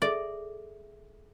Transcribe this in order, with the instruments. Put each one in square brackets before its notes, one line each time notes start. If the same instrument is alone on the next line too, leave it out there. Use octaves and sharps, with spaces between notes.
[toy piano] G#4 A4 E5 [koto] D5